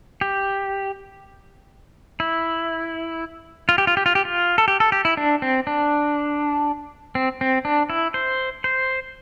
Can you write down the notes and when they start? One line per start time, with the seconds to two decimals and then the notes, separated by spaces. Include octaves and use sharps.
0.21 G4
2.20 E4
3.69 F4
3.78 G4
3.87 F4
3.97 G4
4.06 F4
4.15 G4
4.25 F4
4.58 A4
4.68 G4
4.80 A4
4.92 G4
5.05 E4
5.17 D4
5.42 C4
5.67 D4
7.15 C4
7.41 C4
7.65 D4
7.90 E4
8.14 C5
8.64 C5